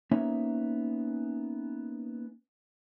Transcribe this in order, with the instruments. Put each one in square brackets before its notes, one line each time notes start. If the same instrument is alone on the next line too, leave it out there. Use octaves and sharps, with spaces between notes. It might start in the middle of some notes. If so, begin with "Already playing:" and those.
[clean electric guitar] A#3 B3 C#4 D#4 C#5 E5